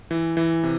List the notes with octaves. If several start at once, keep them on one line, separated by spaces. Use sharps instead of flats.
E3
E3
C3